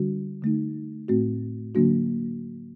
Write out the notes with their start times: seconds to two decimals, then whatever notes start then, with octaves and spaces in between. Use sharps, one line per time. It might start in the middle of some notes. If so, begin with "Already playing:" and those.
Already playing: D3 G3 D4 F#4
0.42 D3 A3 D#4
1.08 A2 A3 C4 F#4
1.75 D3 F#3 A#3 D4 F#4